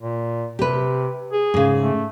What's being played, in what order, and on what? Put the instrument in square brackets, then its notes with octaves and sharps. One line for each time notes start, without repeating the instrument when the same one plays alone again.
[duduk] A#2
[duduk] C3 [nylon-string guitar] G4 B4
[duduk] G#4
[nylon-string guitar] G#2 C#3
[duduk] A3